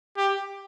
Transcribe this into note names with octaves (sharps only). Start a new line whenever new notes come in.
G4